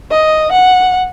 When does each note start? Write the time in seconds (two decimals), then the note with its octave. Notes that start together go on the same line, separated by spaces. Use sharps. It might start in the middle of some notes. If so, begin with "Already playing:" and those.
0.11 D#5
0.52 F#5